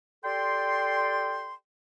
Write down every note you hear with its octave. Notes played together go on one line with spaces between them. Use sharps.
G4 A4 D5 G5 C6